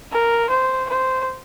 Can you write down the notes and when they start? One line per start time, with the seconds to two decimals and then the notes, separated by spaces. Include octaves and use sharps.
0.12 A#4
0.49 C5
0.89 C5